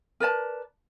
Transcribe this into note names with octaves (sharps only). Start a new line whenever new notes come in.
A#4 B4 D5 A5